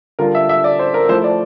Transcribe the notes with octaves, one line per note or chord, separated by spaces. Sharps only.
D3 G3 D4 F4 A#4
E5
E5
D5
C5
A#4
F3 A3 E4 C5
D5